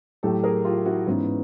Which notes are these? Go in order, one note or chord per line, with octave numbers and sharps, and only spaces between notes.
A2 F#3 G4 A4
G#4 A#4
F4 G4
E4 F#4
G#2 E3 B3 C#4